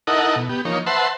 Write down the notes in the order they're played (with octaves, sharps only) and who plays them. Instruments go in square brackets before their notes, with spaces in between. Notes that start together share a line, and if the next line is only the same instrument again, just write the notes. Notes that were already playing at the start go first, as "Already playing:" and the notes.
[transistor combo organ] D#4 E4 A4 A#4 D#5 F#5
B2
B3 G4
F3 A#3 D#4 C#5
B4 C5 E5 F#5 A5 C6